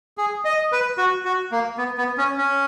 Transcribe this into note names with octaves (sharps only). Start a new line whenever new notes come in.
G#4
D#5
B4
F#4
F#4
A#3
B3
B3
C#4
C#4